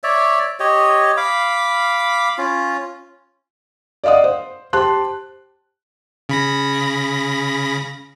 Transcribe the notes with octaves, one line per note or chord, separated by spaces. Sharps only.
C#5 D5 E5
G4 C#5 D#5
F5 B5 D6
C#4 F4
D5 D#5 F5 F#5 D#6
C5
G4 C5 A5 C6 F#6
C#3 B5 A#6